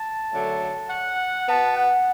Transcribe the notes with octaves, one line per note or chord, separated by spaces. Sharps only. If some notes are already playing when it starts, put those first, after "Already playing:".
Already playing: A5
F#2 D3 F#3 A3
F#5
B2 B3 A5
F#5